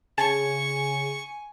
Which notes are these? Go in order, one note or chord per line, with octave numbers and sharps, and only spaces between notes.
C#3 G#5 A5 C#6